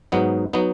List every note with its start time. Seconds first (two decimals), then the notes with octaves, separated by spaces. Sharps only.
0.12 G#2 F#3 B3 D#4
0.53 F#3 B3 D#4